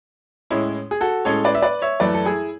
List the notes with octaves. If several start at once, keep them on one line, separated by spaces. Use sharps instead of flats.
A2 G#3 C#4 E4
G#4
F#4 A4
A2 G#3 C#4 A4 C#5
B4 D5
E5
B4 D5
C#5 E5
F#2 E3 A3 B4 D5
A4
E4 G#4